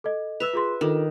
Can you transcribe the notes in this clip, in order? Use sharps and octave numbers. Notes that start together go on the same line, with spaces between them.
A4 D#5
B4 E5 E6 F7
F4 G#4 C6
D#3 D4 F4 A4